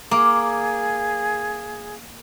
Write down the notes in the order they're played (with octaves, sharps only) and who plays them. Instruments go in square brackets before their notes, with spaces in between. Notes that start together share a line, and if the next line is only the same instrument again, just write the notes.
[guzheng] A#3 [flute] G#4 [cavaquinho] D6